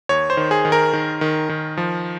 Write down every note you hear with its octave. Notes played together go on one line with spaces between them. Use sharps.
D#2 C#5
C5
D#3
G#4
D#3
A#4
D#3
D#3
D#3
F3